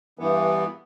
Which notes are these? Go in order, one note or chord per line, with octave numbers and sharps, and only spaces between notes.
G2 E3 B3